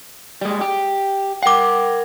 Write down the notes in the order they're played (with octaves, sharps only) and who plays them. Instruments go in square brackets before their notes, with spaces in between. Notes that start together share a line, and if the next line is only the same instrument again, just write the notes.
[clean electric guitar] G3 G#3
G4
[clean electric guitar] A#4 F#5 [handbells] G5 D6